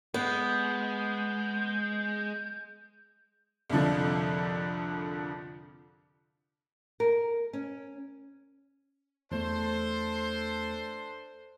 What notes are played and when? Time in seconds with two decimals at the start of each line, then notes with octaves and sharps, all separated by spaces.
0.14 G#3 B3 G6
3.70 C2 F2 D3 F3
7.00 A#4
7.53 C#4
9.31 E2 A3 D4 A4 C5